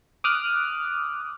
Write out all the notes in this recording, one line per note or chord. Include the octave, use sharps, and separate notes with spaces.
D6 D#6 F6 F#6